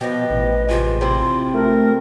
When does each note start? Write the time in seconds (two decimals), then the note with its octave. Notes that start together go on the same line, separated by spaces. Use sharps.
0.01 B2 F3 G4 B4 D#5
0.30 A1
0.69 C3 G#3 F4
1.01 C3 C4 E4 C6
1.54 A3 A#4